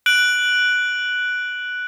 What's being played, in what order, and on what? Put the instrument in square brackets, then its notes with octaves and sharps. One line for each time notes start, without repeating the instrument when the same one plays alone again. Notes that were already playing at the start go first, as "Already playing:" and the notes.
[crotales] F#6 D7 F#7